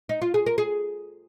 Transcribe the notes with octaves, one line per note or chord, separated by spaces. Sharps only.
D#4
F4
G#4
A#4
G#4